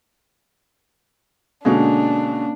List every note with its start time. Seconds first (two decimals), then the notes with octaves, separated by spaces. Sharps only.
1.65 B2 D3 G#3 A#3 C#4 D4